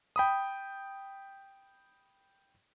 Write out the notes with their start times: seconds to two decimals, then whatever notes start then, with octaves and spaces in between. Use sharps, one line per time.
0.16 G5 B5 D#6